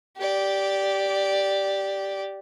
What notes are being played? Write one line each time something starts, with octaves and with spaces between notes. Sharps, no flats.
G4 D5